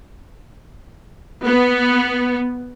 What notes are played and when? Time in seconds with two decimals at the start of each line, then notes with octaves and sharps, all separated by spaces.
1.46 B3